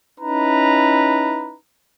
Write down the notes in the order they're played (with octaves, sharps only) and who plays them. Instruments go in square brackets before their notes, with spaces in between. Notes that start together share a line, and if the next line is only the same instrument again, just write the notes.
[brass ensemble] C#4 D#4 E4 B4 A#5